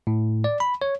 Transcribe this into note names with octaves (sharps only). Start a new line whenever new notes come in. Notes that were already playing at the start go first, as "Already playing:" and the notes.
A2
D5
B5
C#5